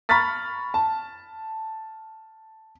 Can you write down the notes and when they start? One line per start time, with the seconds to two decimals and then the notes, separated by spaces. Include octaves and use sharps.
0.09 A#5 B5 C#6 F6 A6 B6
0.74 A5